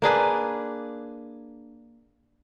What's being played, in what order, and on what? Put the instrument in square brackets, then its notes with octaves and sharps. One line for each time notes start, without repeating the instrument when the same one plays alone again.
[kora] A#3 D4 G#4 B4